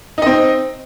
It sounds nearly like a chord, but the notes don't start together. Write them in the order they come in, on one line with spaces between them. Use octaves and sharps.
D#4 D#5 C4